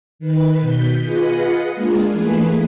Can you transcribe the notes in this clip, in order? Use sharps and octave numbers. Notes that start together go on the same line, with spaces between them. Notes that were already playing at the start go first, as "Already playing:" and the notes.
D#3 B4
B2 G6 B6
F4 G#4 B4 D#5 F#5
G#3 A#3 D4 F4 G#4
E3 A3 A#3 G#4 B4